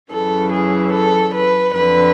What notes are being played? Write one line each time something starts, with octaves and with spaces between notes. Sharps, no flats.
F#2 C#3 E3 A4
G#4
A4
B4
F2 D3 B4